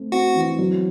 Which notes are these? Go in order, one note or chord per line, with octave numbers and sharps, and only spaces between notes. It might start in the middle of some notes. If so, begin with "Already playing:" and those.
Already playing: A3 C4
C4 F#4
E3
F#3